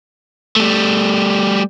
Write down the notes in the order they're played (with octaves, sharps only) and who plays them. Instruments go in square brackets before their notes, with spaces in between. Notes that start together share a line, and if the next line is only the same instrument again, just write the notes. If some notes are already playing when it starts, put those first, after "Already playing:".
[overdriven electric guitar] G3 A3